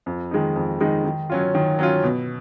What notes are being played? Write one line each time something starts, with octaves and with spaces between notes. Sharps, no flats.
F2
D#3 G#3 D#4
F2
D#3 G#3 D#4
D#3
F#3 C#4 F4
D#3
F#3 C#4 F4
B2